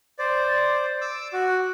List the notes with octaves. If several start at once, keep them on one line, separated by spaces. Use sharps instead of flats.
C5 D5
D6 E6
F#4